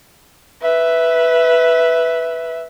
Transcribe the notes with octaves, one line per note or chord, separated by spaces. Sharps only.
B4 E5